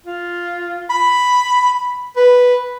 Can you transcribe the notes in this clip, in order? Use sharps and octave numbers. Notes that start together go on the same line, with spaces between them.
F4
B5
B4